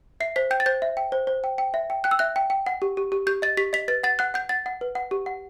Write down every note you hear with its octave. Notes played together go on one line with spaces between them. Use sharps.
E5 C7
C5 B6
G5 G6
A6
C5 G6
E5
G5
C5
C5
G5
G5
E5
G5
G5 F#6
E6
E5 F#6
G5
G5
F#5
G4
G4
G4
G4 G6
D#5 A6
G4 B6
D#5 B6
B4 A6
F#5 A6
F#5 F#6
F#5 G6
F#5 A6
F#5
B4
F#5
G4
F#5